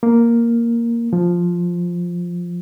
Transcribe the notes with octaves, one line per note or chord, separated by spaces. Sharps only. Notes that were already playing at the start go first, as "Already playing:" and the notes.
A#3
F3